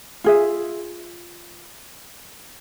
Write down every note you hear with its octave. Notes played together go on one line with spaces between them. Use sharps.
F4 G#4 E5